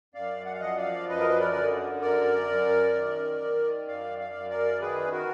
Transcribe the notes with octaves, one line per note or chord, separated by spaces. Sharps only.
F#2 D5 F5
F#5
F5
F3 D#5 F#5
D5 F5
F#2 B4 D#5
A#4
B4
A#4 D5
D3
F#2 A#4 D5
F#2
D#3
D#3
F#2 D5 F5
D5 F5
F#2
A#4 D5
D#3 G#4 B4
F#4 A#4